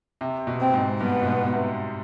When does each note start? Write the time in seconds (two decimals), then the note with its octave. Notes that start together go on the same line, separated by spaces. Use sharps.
0.21 C3
0.47 B2
0.61 C4
0.74 G#2
1.00 G2 B3
1.22 B2
1.27 G#2
1.53 C3